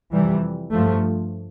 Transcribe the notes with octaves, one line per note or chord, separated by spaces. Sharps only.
F2 C3 E3 G3
G2 F3 A3